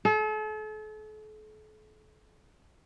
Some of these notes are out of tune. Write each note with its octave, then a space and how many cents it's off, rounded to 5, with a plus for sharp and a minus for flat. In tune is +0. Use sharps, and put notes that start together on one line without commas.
A4 -40